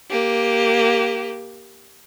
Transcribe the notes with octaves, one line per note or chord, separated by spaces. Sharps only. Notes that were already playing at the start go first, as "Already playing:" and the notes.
A#3 G4